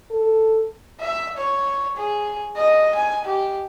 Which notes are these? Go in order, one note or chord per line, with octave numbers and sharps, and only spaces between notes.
A4
E5
C#5
G#4
D#5
G#5
G4